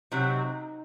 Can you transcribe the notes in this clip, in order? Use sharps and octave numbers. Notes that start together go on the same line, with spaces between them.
C3 F#3 C4 D#4